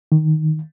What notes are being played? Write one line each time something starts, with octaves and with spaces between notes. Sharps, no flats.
D#3